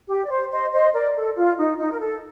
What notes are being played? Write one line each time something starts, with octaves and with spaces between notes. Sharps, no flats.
G4
D5
C5
C5 D#5
C5 D#5
A#4 D5
A4
F4
D#4
D#4
A#4
A4